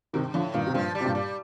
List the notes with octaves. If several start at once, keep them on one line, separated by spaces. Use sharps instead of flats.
G2 C3 D#3
A2 D3 F3
G2 A#2 D#3
C3
G2 A#2 F3
G3
C3
G2 A#2
G3